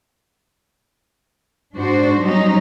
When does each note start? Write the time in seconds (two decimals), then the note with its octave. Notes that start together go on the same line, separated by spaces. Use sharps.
1.75 G#2 D4 F#4 C5
2.20 F#3 G3 C#4 D#4